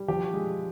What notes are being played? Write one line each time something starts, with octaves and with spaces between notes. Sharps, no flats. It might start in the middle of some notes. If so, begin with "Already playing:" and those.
Already playing: G3
F3 G4
G#3